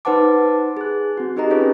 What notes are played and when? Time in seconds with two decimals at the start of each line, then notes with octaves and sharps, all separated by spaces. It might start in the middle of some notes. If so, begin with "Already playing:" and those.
0.05 D#4 B4 C5 F#5 A5 D6
0.77 G#4 F#6
1.17 C4 F#4
1.36 D#4 G4 G#4 A#4 D#5 A#5
1.50 C#4 F4 A4 B4 C#5